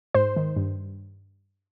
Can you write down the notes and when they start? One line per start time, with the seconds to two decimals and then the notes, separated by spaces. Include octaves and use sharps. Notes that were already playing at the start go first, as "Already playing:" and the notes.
0.15 G#2 C5
0.36 D#3
0.56 G2